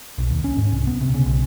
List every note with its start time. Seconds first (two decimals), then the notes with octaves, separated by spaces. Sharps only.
0.18 B1
0.30 D#2
0.44 C#4
0.57 G#2
0.72 C2
0.87 B3
1.01 C3
1.14 C#3
1.26 B1